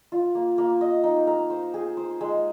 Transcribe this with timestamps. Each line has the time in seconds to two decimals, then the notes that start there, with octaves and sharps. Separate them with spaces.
0.12 F4
0.35 A#3
0.58 A#3
0.81 D#5
1.04 D#4
1.27 A#4
1.50 C5
1.74 G#4
1.97 C5
2.21 G#3